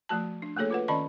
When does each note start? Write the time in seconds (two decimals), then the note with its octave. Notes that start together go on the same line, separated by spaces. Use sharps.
0.09 F3 A3 F#4 A5
0.42 D4
0.57 A3 A#3 F#4 G#4 A4 C#5
0.71 F4 B4 F#5
0.88 D#3 C#4 D5 D#5 A5 B5